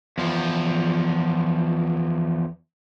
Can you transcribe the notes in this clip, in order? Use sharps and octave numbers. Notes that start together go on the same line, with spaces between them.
E2 F3